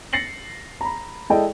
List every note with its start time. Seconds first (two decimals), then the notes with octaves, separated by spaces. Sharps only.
0.13 A6 A#6 C7 C#7 F#7
0.81 A#5 B5
1.30 G#3 E4 A4 D5 D#5 G5